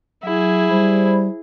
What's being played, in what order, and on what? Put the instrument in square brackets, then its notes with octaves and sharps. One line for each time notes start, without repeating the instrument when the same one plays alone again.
[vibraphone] F#3 [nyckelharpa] E4 G#4
[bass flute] G3 [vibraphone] C5 B5